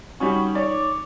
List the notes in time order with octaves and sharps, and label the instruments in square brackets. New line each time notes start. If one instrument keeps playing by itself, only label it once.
[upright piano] G3 C#4 [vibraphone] D#4 [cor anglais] F#4
[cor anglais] C#5 [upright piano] D5
[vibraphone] D6